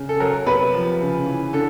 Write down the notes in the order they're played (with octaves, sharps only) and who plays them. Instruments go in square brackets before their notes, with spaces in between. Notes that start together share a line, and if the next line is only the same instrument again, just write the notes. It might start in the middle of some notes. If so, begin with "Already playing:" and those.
Already playing: [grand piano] C#3
A4
F#3 A#4
C3 B4
F3
C#3
E3
D3 A4